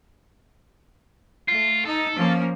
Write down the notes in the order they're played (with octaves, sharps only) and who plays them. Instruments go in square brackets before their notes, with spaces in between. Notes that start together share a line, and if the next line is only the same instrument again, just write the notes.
[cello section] A3 [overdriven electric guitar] F4
[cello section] D#4 [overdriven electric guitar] A4
[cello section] F3 A#3 C#4